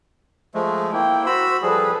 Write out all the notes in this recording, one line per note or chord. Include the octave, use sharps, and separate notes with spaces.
F3 G#3 A3
A#3 E4 G5
F#4 C5 B5 E6
F3 G3 G#4 A4 B4